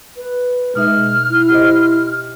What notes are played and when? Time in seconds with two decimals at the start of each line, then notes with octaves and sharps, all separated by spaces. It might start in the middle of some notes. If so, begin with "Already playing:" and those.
0.16 B4
0.75 B2 G#3 D#4 E5 F6
1.30 E4
1.50 G4 C5 D#5